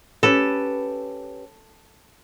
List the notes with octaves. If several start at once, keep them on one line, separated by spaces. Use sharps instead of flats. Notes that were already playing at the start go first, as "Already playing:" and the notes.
C#4 G4 A4 B4